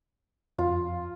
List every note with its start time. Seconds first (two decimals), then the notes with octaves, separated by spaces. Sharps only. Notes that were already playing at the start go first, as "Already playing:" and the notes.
0.58 F2 F4